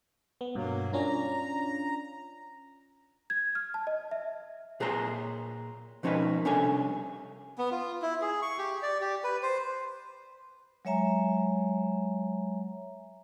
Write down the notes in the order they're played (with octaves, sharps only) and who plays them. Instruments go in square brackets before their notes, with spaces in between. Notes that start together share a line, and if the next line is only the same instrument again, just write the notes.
[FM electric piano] B3
[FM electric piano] G2 B2 [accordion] F#3 A#3
[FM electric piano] C#4 D4 F4 [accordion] A#5
[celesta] G#6
F6
A5
D#5
E5
[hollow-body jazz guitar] A#2 G#4 B4 C#5 A#5 C6
B2 F3 C#4 D#4 A#4 B4
C2 C#4 D4 A4 C#5 G#5
[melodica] B3
F4
E4
G#4
C#6
G4
D5
G4
B4
C5
[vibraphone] F#3 G#3 C#5 E5 G#5 A#5